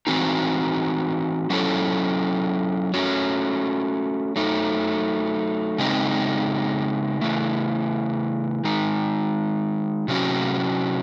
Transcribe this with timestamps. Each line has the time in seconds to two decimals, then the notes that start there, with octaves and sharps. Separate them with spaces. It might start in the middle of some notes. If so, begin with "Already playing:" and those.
0.07 E3 C4 D#4 F#4
1.50 F#3 C#4 E4 A4 C#5
2.94 A3 C#4 F#4 C#5
4.36 F#3 A3 D#4
5.78 C#3 G#3 C4 D#4
7.21 C#3 E3 A3
8.64 D#3 G#3 D#4
10.08 C3 F#3 C#4 F#4